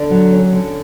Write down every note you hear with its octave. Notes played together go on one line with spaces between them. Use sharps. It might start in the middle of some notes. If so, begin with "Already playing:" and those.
Already playing: D3 D5
F#3
C#4
D3